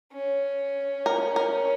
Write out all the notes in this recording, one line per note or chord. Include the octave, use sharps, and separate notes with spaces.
C#4
A#4
A#4